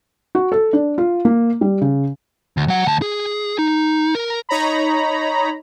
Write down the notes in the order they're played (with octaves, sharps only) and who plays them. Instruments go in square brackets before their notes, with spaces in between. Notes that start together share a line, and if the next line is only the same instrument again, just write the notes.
[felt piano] F#4
A4
D4
F4
A#3
G3
C#3
[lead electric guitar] D2
F#3 F#5
D2 A5
G#4
D#4
A#4
[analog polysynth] D#4 C#5 A#5 B5